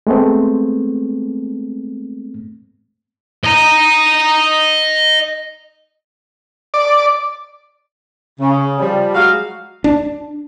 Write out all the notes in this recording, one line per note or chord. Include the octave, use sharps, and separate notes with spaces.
G#3 A3 B3 C4
D#5 A#5
D5
C#3
F3 G3
F#3 G#3 F#4 F5
D4